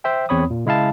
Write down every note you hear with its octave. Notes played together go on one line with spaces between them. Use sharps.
C5 E5 G5
E2 C4 C#5 B5 D#6
A#2
C#3 G#3 E4 F5 A5